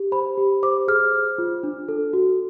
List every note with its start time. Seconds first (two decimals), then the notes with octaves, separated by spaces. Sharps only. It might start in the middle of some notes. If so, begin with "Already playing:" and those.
Already playing: G4
0.12 C5 B5
0.37 G4
0.63 C5 D6
0.88 G#4 F6
1.13 C5
1.38 F4
1.63 D4
1.88 A4
2.13 F#4